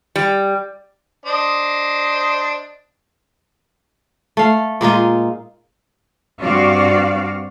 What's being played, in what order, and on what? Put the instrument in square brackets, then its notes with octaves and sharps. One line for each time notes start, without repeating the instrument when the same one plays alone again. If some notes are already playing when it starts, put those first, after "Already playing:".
[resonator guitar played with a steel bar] G3
[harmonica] D4 C5 D#5
[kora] A3 F5
A#2 G#3 D#4 F4
[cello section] G2 C4 F#4 D5 F5